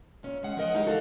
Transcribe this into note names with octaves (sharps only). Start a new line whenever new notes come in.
A#2 C#4
G#3 F#5
F3 C#4 A#4 D#5 F#5
G#3 D#4 E4 G4
F#4 A4 F5